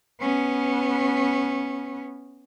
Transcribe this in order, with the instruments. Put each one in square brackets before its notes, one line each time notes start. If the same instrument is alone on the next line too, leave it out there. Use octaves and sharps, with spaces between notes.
[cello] B3 C#4